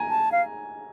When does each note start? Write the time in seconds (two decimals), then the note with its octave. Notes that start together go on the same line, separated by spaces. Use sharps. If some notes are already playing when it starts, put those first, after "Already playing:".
Already playing: G#5 A#5
0.10 A5
0.32 F5